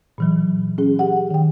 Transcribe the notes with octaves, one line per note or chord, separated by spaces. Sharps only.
A#2 E3 F#3
C#4 G#4
G4 F#5
D#3 G5